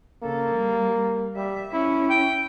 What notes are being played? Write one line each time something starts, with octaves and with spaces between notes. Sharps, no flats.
C#3 A#3 A4
G3
G3 E5
C#4 E4
G5